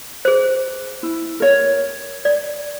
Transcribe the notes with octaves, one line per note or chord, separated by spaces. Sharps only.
G#4 C5
E4
A#4 C#5
D5